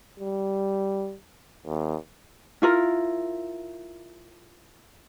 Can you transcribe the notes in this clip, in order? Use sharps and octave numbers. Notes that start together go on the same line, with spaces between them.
G3
D#2
E4 F4 A#4